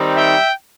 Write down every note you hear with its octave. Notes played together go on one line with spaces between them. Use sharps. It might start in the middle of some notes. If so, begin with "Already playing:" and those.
Already playing: D#3 G3 C4 D#4
E5 G5